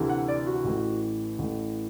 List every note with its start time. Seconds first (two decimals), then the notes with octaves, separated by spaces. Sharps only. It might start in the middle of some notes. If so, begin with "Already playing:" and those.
Already playing: D2 C3 E3
0.09 F#5
0.28 D5
0.47 F#4
0.65 A1 A2 E3
1.39 A1 A2 E3